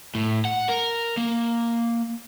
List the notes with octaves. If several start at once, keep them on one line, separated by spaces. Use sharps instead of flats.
A2
F#5
A#4
A#3